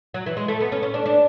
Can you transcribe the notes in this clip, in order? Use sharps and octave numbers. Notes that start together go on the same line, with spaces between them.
F#3
E3
G#3
A3
B3
C#4
C#4
D4
D4